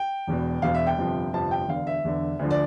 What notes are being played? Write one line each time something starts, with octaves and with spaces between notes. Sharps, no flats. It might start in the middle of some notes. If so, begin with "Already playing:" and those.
Already playing: G5
E1 E2 B2
E1 E2 B2 F5
E5
G5
G1 F2 C3 F3
G1 F2 C3 F3 A5
G5
E1 E2 D3 F5
E5
E1 E2 D3
D2 D3 F3
D5